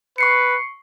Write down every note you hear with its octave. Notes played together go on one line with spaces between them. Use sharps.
B4 C#6 C7 C#7